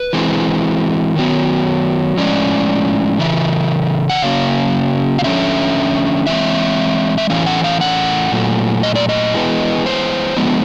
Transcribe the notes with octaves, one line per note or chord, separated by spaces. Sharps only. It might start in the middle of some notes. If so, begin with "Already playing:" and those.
Already playing: B4
E3 G#3 C4
D#3 F#3 B3
A2 F3 G#3 C#4 D5
C#3 E3 E5
F#5
C#3 F#3 A#3 C#4 F5
F5
D3 F3 A3 C#4 E5
E3 G#3 C4 E5
E5
A2 E3 A3 C#4 F5
F#5
F5
F#5
A#2 F#3 A3
D#5
D5
D#5
E3 G#3 B3
C5
D3 F3 G#3 B3